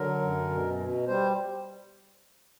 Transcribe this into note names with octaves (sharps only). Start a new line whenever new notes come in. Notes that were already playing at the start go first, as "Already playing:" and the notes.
Already playing: D3 F#3 A#4
F#2
B2
B2
G3 C5